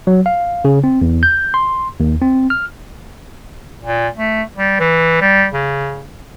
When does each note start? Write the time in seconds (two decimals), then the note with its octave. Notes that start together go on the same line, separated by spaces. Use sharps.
0.07 F#3
0.26 F5
0.65 C#3
0.84 C4
1.01 E2
1.23 G6
1.54 C6
2.00 D#2
2.22 C4
2.50 F6
3.83 A#2
4.18 A3
4.57 G3
4.80 E3
5.21 G3
5.53 C#3